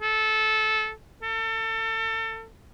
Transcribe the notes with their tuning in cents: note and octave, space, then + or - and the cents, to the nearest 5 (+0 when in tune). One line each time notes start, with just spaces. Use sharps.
A4 -15
A4 +30